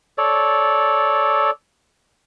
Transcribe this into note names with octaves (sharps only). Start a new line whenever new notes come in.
A4 C#5 D5